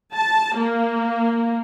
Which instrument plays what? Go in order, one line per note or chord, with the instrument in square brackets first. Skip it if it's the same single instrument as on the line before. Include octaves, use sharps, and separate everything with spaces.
[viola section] A5
A#3